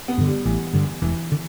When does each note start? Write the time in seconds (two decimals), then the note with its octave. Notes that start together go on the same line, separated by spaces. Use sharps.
0.08 B3
0.18 G2 D3
0.27 G3
0.45 A1 E3
0.73 G2 D3
1.02 E1 E3
1.32 D3